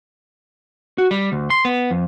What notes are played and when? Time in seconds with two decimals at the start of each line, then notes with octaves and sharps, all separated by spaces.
0.98 F#4
1.11 G3
1.32 D2
1.50 C6
1.65 B3
1.91 F2